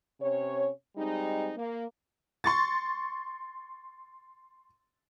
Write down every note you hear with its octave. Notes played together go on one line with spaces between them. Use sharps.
C3 C#4 C#5
G3 G#3 C4 D#4
A#3
C6 C#6 A6